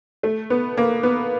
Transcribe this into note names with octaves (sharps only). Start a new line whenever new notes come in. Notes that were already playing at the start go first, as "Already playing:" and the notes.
A3
B3
A#3
B3